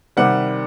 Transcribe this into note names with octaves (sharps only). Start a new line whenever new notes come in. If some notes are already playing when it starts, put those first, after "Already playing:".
C3 D#3 G3 F#5